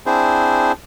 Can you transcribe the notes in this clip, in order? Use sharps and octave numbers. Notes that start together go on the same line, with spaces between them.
C4 D4 E4 G#4 C5